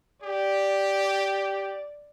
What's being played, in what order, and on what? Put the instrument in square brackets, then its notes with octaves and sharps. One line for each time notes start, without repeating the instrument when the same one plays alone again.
[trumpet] G4 [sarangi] D5